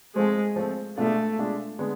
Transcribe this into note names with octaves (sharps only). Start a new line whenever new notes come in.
F3 G#3 A3 C4
F3 A3 C4
B2 G#3 A3 D4 F4
B2 G#3 D4 F4
D3 G#3 B3